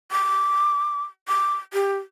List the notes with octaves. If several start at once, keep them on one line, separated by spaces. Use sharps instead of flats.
D6
D6
G4